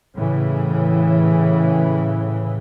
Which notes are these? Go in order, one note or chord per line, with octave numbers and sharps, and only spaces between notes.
A2 C#3 E3